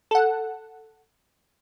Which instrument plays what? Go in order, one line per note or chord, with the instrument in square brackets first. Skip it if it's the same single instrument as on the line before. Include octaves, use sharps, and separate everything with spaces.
[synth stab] A4 F#5